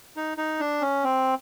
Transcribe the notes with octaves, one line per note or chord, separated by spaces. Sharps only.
D#4
D#4
D4
C#4
C4